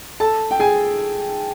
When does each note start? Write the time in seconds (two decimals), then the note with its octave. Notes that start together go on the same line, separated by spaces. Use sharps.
0.20 A4 A5
0.51 G5
0.59 G#4 G#5